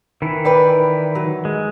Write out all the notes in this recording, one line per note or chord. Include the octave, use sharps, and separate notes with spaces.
D#3 E3 E4
B4 D5 G5
F#3
G#3